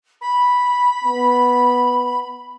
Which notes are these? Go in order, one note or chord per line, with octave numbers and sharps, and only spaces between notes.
B5
B3